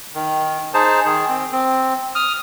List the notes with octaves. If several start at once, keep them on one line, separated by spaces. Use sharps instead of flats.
D#3
D#4 G#4 C5 A5
D#3 G#4
C4
C4
D#6 F6